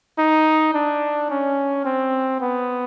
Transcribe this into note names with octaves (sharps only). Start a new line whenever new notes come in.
D#4
D4
C#4
C4
B3